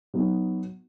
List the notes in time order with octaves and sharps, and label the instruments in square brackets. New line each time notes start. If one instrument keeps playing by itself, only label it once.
[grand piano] F#3 B3 D#4 F#4